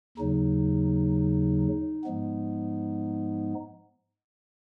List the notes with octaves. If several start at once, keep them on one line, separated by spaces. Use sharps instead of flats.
D#2 C#3 F#3 D#4
G#2 F3 G#3 B3